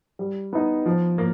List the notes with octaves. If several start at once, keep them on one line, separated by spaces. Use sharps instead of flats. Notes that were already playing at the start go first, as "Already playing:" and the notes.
G3
B3 D#4
F3
A#3